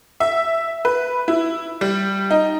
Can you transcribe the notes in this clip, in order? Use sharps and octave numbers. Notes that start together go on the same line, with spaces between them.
E5
B4
E4
G3
D#4